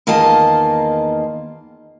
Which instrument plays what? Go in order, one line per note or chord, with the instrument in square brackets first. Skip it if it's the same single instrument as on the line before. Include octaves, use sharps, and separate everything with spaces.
[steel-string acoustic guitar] E2 D#3 A#3 F4 D#5 A5